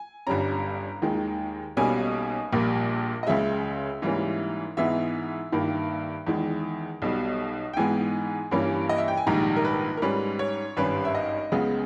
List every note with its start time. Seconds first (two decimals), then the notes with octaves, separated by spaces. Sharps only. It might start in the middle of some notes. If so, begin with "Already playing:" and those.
Already playing: G#5
0.27 G1 G2 G3 C#4 A#5
1.02 D#2 D#3 G#3
1.77 B1 B2 G3 A#3 C#4 G#5
2.52 A#1 A#2 G3 A#3
3.23 D#5
3.27 C#2 C#3 G#3 E5
4.02 G#2 E3 G3 A#3 C#4
4.77 G#2 E3 G#3 B3 E5
5.52 G2 D#3 A#3
6.27 E2 D#3 G#3
7.02 B1 B2 G3
7.73 G5
7.77 G#2 E3 G#3 B3 G#5
8.51 G2 E3 G3 A#3 C#4
8.89 D#5
8.98 E5
9.08 G5
9.17 G#5
9.26 A#1 G#2 D#3 G3 A#5
9.56 A#4
9.65 B4
9.97 A#4
10.02 G#2 G3 C#4 B4
10.39 C#5
10.77 G#1 G2 G3 C#4 B4
11.05 E5
11.15 D#5
11.52 C#2 C#3 G#3 B3